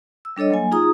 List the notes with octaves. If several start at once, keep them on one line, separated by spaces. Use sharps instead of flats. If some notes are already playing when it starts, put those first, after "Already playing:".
E6
G3 D4 A4 C#5 D#5
F#3 A#3 G#5
D#4 F4 G#4 A#5 D#6